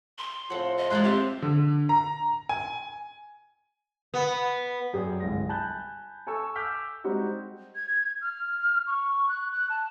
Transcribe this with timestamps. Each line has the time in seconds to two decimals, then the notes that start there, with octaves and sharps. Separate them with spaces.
0.18 C6
0.50 A2 C#3 F3 C4 F#5
0.77 D#5
0.90 E2 G#3 D5 A#5 C6 F#6
1.04 C4 G4 E5 G5
1.42 D3
1.89 A#5
2.49 G#5
4.14 B3
4.93 F#2 G#4 D5 G5
5.20 G1 C2 G#3 A#6
5.49 G#5 A5 B5 F#6 G6
6.27 A4 G#5 A5 C#6 E6
6.56 D6 E6 F6 G6 B6
7.04 G3 G#3 C4 D#4 F#4 G4
7.75 G#6
8.21 F6
8.87 C#6
9.29 F#6
9.52 F#6
9.70 A5